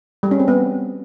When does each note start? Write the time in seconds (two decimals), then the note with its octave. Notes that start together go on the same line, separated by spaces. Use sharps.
0.23 G3
0.31 C#4
0.40 C4
0.48 B3